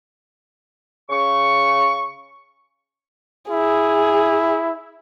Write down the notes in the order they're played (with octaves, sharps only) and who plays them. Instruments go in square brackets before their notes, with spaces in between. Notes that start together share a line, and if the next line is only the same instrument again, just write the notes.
[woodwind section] C#3 C#6
[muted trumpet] E4 [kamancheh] G#4